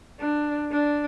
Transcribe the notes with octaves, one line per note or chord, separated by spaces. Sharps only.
D4
D4